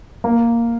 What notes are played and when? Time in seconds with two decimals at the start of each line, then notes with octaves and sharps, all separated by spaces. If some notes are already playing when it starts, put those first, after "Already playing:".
0.24 A#3